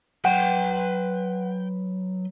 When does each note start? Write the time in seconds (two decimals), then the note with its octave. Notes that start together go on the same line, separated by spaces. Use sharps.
0.25 F#3 B4 F#5 G5 C6